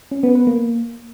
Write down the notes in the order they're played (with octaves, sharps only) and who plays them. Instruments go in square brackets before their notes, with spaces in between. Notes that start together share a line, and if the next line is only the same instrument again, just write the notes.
[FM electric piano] C#4
B3
B4
A#3